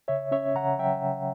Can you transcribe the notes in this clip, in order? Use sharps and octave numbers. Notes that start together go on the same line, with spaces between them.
C#3 C#5 E5
C#4 C#5 E5
C#3 F#5 A#5
F#3 E5 G5
C#3